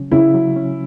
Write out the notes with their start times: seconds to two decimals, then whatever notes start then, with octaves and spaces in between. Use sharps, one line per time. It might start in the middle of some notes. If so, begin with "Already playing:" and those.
Already playing: C#3 F#3 C#4
0.12 C#3 E4
0.35 F#3
0.56 C#4